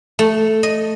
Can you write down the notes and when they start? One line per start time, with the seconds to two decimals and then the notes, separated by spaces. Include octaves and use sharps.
0.19 A3
0.63 D#5